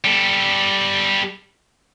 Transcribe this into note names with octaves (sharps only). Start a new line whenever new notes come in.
G3 A4